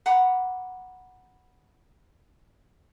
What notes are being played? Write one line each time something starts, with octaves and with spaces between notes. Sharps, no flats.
F#5 A#5 B5 D6